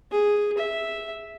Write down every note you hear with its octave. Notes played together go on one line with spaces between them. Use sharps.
G#4
E5